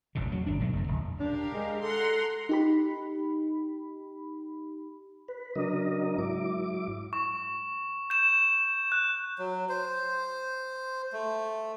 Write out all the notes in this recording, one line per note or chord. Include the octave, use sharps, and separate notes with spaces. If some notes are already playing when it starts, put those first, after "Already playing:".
E1 A1 E2 C#3
F#3
G1 D4
B2 F#3 G3 A3
F#1 F2
D1
D4 G4 A#4 F5
G#3
A4 F#5 A#5 C6
D#4 G4 B5
B4
C#3 F#3 D4 A#4 D#5
G#2 F#3 E4 D6
C#6
G6 E7
F#6
F#3
C5
A3